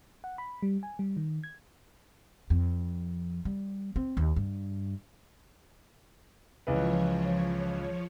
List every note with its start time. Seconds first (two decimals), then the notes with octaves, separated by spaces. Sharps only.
0.24 F#5
0.38 B5
0.63 G3
0.83 G#5
0.99 G3
1.17 D#3
1.44 G#6
2.50 F2
3.45 G3
3.96 C4
4.17 D#2
4.36 G2
6.67 C#2 E3 F3 B4 C#5